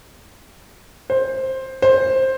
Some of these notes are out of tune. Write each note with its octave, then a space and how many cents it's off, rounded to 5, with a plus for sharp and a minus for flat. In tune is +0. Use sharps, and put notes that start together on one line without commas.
C5 +10
C5 +10